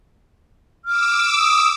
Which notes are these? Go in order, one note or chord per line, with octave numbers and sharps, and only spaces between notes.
D6 E6 F6
D#6